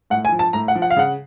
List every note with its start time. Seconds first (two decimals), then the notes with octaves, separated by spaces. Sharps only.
0.10 A2 F#5
0.25 G#5
0.32 F3
0.39 A5
0.53 A2 A#5
0.68 F#5
0.75 F3
0.82 F#5
0.90 F5
0.96 C#3 F#5